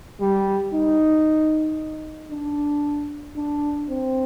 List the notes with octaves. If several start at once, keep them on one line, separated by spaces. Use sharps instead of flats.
G3
D#4
D4
D4
C4